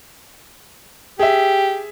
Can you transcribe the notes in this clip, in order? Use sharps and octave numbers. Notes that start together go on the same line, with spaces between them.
G4 G#4 E5